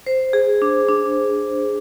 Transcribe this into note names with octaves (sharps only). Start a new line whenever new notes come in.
C5
G#4
D4
D4